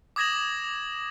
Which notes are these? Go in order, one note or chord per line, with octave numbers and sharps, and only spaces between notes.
D6 D#6 G#6 A#6 E7 F#7